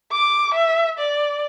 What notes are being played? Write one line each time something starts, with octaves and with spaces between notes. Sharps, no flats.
D6
E5
D5